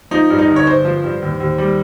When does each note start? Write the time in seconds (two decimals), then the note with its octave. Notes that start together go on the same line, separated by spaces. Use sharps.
0.11 F3 D#4
0.30 G2
0.39 D#4
0.48 G1
0.56 C#5
0.67 G1 C5
0.85 F3
1.04 G2
1.22 D#2
1.40 D#2
1.58 G3